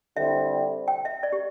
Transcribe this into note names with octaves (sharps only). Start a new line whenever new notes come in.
D3 G3 C4 E4 E5
G5
E5
D5
G4